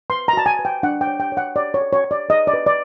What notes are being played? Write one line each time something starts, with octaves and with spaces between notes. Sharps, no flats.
B4 C6
A#5
F#4 A5
G#5
B4
G5
D4 F#5
G5
C#5
G5
C#5
F#5
C#5 D5
C#5
A4
C#5
C#5
D5
B4 D#5
D5
B4
D5